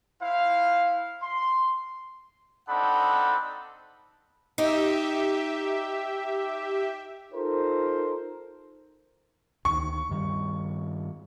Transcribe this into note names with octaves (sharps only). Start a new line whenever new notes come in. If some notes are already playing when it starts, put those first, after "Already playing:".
E4 C5 F5
C6
C4 D4 D#4 A4 F#5 B5
D#4 G4 E5
D#4 F4 A4 A#4 C5
D2 D#3 C#6
G2 D#3 G3